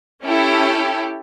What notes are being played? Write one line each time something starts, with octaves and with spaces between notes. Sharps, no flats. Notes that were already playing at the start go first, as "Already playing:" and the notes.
C#4 E4 G4 A4